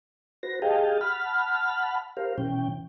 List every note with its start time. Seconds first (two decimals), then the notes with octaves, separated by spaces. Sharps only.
0.43 F#4 B4 C5 A#6
0.62 G4 G#4 D#5 F5 G5 A5
1.01 F#5 A5 B5 F6
2.17 G4 A#4 C5 F5
2.38 B2 E3 C#4 G5